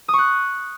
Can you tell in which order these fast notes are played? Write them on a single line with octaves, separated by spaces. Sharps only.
D#6 C#6 F#6